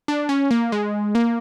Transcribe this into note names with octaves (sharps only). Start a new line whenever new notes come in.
D4
C#4
A#3
G#3
A#3